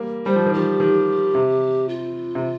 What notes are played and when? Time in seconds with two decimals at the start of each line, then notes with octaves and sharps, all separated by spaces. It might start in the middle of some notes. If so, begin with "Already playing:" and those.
Already playing: G3 A#3
0.26 G3 C5
0.36 F3
0.46 D#3
0.54 F3 G4
0.80 D#3
1.35 C3
1.89 F4
2.35 C3